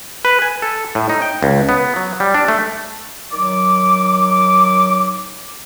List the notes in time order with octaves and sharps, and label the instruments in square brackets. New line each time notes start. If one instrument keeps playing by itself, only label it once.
[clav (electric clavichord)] B4
G#5
A4
A2
D#4
G5
C#2
B3
F#3
G3
D4
A3
[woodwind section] D#3 F#3 D6